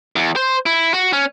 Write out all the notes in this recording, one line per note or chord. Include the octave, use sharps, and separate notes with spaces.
E2
C5
E4
F#4
C#4